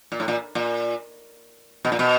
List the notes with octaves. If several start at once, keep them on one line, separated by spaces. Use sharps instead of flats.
A#2
A2
A#2
A#2
B2
A#2
B2